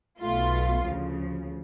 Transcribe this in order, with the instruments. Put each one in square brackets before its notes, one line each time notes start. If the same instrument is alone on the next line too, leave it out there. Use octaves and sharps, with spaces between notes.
[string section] B1 B2 A3 F4
D2 C#3 F3